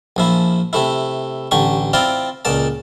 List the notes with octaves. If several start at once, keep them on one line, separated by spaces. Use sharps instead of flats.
A#1 F3 E4
C3 A3 E4
A1 D3 G4 C#6
C4 E4 F4 D5 A#5
C#2 A#2 D5 A5